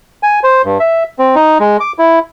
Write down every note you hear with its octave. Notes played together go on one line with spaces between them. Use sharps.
G#5
C5
G2
E5
C4
D#4
G#3
D6
E4